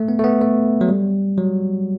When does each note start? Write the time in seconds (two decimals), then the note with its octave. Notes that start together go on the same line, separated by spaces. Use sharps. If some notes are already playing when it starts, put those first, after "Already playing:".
Already playing: A3
0.08 B3
0.19 A3
0.24 B3
0.41 A3
0.81 F#3
0.89 G3
1.38 F#3